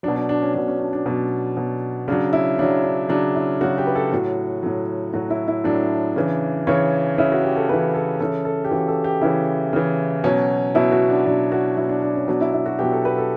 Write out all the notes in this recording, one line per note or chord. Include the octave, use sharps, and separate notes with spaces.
B2 F#3 D4
D4
D4
C#4
B2 F#3 D4
C#4
D4
D4
B2 F#3
B2 F#3
C#3 F#3 D4
E4
C#3 F#3 D4
D4
C#3 F#3 D4
E4
C#3 F#3 F#4
G4
B4
A4
A2 F#3 F#4
A2 F#3
A2 F#3 F#4
E4
E4
A2 F#3 D4
C#3 E3
C#3 E3 C#5
C#3 E3 E4
F#4
G4
A4
C#3 E3 B4
A4
C#3 E3 A4
A4
G4
C#3 E3 F#4
A4
G4
C#3 E3 E4
C#3 E3
B2 F#3 C#4
B2 F#3 E4
F#4
D4
B2 F#3 D4
F#4
B2 F#3 E4
D4
D4
C#4
B2 F#3 D4
E4
E4
F#4
B2 F#3 G4
A4
B4
A4